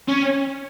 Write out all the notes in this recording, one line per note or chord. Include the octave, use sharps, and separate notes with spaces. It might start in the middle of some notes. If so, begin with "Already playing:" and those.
C#4